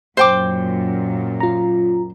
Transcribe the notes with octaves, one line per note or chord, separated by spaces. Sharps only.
F#2 A#2 C5 G5 D6
F4 A#5